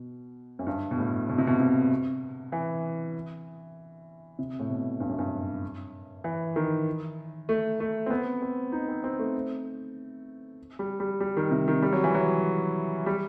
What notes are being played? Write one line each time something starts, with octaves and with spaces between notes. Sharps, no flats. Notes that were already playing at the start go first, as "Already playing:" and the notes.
Already playing: B2
F#2
G2
B2
A2
B2
C3
B2
C3
E3
C3
A2
B2
G2
F#2
G2
E3
D#3
A3
A3
C4
B3
C4
D#4
C4
C4
A3
G3
G3
G3
D#3
C3
D#3
G3
F#3
E3
F#3
G3